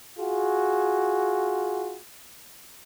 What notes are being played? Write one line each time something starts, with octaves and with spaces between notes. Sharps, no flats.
F4 F#4 G#4